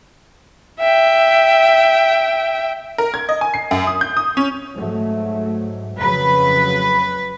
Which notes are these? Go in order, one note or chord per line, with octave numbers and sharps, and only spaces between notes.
E5 G5
A#4
G#6
D#5
G#5
C7
F#2
D#6
G6
D#6
C#4
G#2 F#3 A3
F2 C#3 F#3 B4